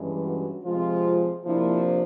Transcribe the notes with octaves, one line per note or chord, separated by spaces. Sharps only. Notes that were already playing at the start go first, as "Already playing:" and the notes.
Already playing: G2 E3 G#3 C#4
F#4
C3 F3 G#3 C4 F4
C3 F3 A#3 D4 E4